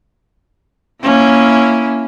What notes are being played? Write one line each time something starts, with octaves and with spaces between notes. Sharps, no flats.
A#3 C#4 E4